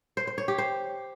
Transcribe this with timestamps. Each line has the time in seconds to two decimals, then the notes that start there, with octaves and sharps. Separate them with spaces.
0.17 C5
0.27 C5
0.38 C#5
0.48 G4
0.58 C5